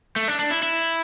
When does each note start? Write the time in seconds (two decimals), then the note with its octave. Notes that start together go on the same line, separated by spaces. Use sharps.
0.16 A3
0.28 D4
0.39 D4
0.50 E4
0.63 E4